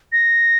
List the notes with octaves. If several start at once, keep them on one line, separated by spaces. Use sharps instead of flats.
A#6